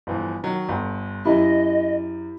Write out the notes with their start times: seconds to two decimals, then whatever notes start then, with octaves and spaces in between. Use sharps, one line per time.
0.07 G1 E3 F3
0.44 D#3 F#3
0.69 G1
1.25 F#2 E4 G4 D#5